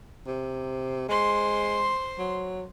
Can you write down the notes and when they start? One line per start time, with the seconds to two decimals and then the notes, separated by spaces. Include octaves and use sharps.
0.27 C3
1.09 G#3 C5 C6
2.19 F#3